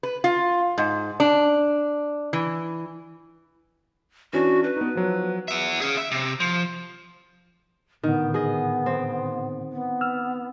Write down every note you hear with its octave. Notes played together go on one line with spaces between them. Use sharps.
B4
F4
G#2
D4
E3
E3 C#4 D4 F#4
B4
B3 D#4
F3 F#3
B3 E5
C#4 G#4
E5
C3
F3
A2 D3 D#3 B3
G#4 D#5
C4
B3
E6 F6